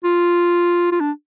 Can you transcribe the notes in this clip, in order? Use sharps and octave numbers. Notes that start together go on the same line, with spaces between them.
F4
F4
D4